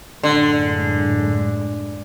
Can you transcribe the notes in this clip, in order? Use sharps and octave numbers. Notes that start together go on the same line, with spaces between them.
F#2 A2 D3 G#3